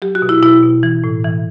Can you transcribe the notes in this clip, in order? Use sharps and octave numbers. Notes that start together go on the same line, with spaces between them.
F#3 G4
F#4
B2
E4
B2 E4
B2
E3
A2
E3